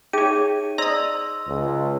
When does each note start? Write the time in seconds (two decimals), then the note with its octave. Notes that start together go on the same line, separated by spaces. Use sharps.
0.13 D#4 G4 G#4 C#5 E5 D#7
0.78 C5 D5 D#5 A#5 C6 D#6 E6
1.47 C#2